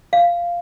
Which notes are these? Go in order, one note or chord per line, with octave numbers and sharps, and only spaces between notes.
F5